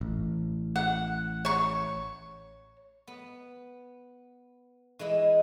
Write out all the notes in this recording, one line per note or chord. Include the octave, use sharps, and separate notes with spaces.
A1
F#5
C#5 C#6
B3
E3 G#3 E4 D#5